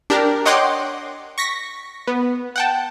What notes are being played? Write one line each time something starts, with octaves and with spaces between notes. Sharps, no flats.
D4 G4 A#4
C#5 D#5 F#5 G5 C6 D6
C#6 A#6 B6
B3
F#5 G5 A5